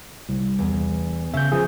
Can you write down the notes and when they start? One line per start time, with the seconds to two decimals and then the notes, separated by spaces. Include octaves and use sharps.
0.29 C2
0.59 E2
1.34 C#3 E5 G6
1.52 F3 G#4